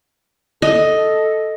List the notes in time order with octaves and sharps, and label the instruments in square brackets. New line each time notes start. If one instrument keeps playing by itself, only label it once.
[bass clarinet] A4 [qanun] D#5